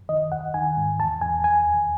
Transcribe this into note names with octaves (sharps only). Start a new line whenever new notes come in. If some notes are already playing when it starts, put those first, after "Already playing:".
Already playing: F#2
D#3 D#5
D#2 F#5
D#3 G#5
G#2
E2 A5
E2 G#5
D#2 G#5
D#2